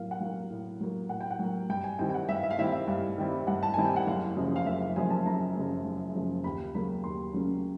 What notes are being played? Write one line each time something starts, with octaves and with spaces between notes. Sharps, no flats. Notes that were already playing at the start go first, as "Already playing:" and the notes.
Already playing: A2 F#3 A#3 F5
F#5
F#3 A#3 F5
A2
F#3 A#3
A2 F#5
G5
F#5
F#3 A#3
G2 G5
G#5
D#3 G3 C4 E4 G5
G5
F#5
G2 E5
F5
E5
F5
D#3 G3 C4 E4 E5
F5
E5
G2 F5
D#3 G3 C4 E4
G2 F#5
A5
D#3 G3 C4 E4 G#5
G5
F#5
F#1 F5
F#2 C#3 F3 A#3
F5
F#1 E5
F5
F#2 C#3 F3 A#3 G#5
A5
F#1 A#5
F#2 C#3 F3 A#3
F#1
F#2 C#3 F3 A#3
D#2 B5
C#3 F#3 A#3 C#4 B5
D#2 C6
C#3 F#3 A#3 C#4